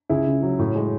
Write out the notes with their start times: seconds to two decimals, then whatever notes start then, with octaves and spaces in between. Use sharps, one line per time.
0.09 C#2 E4 G#4
0.27 C#3
0.43 F#3
0.59 A2
0.76 G#3